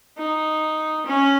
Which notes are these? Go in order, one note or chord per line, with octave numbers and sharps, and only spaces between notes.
D#4
C#4